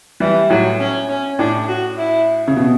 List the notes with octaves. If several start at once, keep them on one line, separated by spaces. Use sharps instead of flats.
E3 G3
A2 F#3
C#4
C#4
A2 D4
F#4
E4
C#3
B2